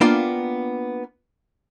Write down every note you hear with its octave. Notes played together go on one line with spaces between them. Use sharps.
A#3 B3 D4 F4 G5